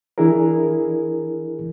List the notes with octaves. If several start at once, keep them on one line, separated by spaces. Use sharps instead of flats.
E3 D4 E4 G#4 A#4